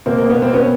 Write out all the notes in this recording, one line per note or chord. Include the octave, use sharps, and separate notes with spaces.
B2 A#3 C4
A#3
B3
A#3 C4
B3 C#4